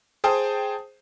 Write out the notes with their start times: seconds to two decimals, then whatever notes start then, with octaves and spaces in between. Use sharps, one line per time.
0.24 G#4 C5 G5 A5 D#6